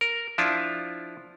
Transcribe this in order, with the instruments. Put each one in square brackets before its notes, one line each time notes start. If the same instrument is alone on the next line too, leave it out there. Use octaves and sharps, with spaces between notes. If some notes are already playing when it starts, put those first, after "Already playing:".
[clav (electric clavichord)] A#4
F3 D4 E4 F4